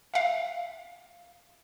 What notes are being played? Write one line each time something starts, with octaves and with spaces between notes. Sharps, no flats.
E5 F5